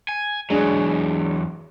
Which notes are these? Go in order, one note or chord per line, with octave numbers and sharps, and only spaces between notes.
G#5
E2 F#3 G#3 D4 G#4